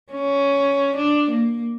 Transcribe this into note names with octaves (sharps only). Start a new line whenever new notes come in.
C#4
D4
A#3